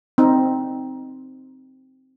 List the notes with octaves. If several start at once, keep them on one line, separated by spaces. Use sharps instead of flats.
C4 D#4